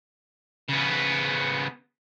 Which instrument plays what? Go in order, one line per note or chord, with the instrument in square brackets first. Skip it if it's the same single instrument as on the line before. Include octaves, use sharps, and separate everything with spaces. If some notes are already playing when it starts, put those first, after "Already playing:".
[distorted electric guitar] C#3 B3